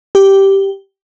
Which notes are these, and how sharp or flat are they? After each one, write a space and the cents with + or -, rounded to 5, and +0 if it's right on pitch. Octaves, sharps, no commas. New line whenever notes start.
G4 -5